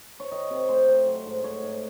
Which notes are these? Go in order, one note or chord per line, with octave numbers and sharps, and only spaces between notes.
C#5
D#3 D#5
C3
A3 C5
C3
F#3
G#2
A3 C#5
G#2